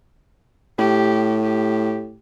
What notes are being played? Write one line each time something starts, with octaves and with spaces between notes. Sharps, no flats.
A2 G4
G4